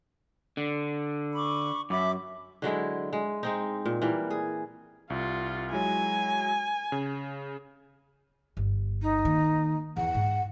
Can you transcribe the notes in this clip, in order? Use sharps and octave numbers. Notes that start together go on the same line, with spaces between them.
D3
B5 C#6 D6
F#2 E5 B5 D6
D3 F#3 G#3 E4
G#3
G#3 C4 D#4
A#2
E3 G3 A#3
G#4
C2 F4
F#3 G#3 E4 G#5
C#3
G1
D#4
D#3 A#3
E2 F#5
G#2